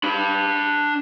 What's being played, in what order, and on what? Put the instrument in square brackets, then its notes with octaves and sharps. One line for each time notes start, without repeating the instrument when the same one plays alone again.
[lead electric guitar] D4 B5